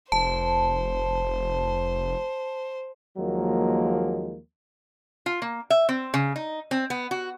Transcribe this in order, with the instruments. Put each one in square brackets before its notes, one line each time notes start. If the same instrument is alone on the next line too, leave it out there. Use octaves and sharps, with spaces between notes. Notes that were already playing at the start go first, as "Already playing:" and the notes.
[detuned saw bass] F1 [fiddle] C5 [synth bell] A5
[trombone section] D#2 F3 F#3 G#3 A#3
[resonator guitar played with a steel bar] F4
A#3
E5
C4
C#3
D#4
C4
B3
F#4